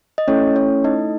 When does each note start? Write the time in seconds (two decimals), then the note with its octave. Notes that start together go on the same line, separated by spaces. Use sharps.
0.18 D#5
0.28 A3 C#4 E4 A4 C#5
0.56 C#4 C#5
0.84 D#4 D#5